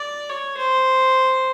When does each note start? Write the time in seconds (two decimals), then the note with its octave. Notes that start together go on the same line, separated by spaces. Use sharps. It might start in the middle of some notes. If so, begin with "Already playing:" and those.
Already playing: D5
0.30 C#5
0.58 C5